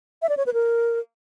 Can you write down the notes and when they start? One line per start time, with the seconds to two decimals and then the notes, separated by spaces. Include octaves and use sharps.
0.22 E5
0.29 D5
0.37 C#5
0.46 B4
0.54 A#4